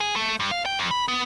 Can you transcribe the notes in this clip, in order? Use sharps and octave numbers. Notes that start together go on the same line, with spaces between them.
G#4
A3
G2
F5
G5
F2
B5
B3